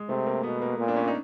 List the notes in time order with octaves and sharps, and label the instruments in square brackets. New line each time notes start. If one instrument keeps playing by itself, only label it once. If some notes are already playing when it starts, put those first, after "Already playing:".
Already playing: [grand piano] G#3
[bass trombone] C3 [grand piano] A3
[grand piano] A#3
[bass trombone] B2 [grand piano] B3
[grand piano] A#3
[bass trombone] A#2
[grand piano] D4
C#4
D#4